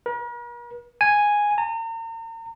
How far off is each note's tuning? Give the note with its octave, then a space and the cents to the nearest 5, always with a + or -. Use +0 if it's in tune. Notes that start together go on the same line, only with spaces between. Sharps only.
A#4 +45
G#5 -5
A#5 -40